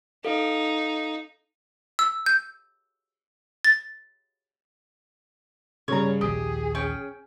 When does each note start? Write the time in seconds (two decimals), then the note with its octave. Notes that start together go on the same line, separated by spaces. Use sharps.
0.25 D#4 A4 F5
1.99 E6
2.26 G6
3.64 A6
5.88 G2 C#3 C#5 A#5
6.21 A#1 D#2 G4 G#4 D#6
6.75 C#4 G5